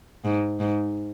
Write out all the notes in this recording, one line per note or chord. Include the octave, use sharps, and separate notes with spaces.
G#2
G#2